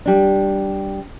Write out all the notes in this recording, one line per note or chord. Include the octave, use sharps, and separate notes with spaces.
G3 D4